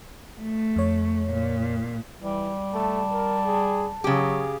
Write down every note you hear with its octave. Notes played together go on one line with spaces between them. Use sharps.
A3
F2 C#5
A#2
E3 G3
A3 A5
A#4
G#4
C#3 F#3 G4 G#4